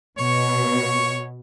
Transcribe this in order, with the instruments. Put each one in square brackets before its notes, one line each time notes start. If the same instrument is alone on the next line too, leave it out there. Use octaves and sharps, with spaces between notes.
[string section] B2 [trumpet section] C#5 C#6